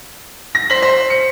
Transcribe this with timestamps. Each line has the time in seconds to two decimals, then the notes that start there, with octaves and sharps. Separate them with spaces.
0.55 A#6
0.70 C5 B6 F#7
0.82 C5
1.10 C#7